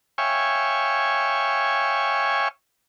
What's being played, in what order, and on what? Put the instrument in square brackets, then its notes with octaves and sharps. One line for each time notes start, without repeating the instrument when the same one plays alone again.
[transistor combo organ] C#5 E5 F5 G5 G#5 C#6